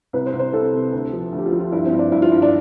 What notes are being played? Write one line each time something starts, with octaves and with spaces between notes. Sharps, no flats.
C2 B4
C5
C2
C5
C2 A4
C3
D2
F3
D2
G4
F4
F3
F4
G2 E4
C4
G2
D4
G2 E4
F4
G2
D4